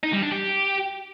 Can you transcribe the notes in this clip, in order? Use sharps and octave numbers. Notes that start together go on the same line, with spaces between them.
D#4
G3
D4
G4